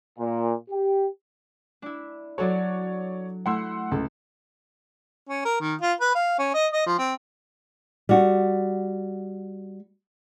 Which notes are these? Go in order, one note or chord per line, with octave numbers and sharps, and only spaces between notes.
A#2
G4
D4 E4
F#3 F#4 A4 C#5 D5
A3 E4 F#5 C6 E6
C#2 A4
C#4
A#4
D#3
F4
B4
F5
C#4
D#5
D#5
F3
C4
G3 F#4